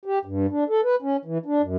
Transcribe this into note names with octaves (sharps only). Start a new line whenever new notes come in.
G4
G2
D4
A4
B4
C#4
E3
D4
F#2